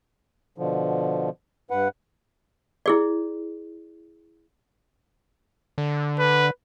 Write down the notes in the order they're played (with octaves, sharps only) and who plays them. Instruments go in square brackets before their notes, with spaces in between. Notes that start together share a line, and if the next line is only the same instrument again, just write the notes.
[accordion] B2 D3 F3
G2 B4 F#5
[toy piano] E4 G#4 D5
[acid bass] D3
[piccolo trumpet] B4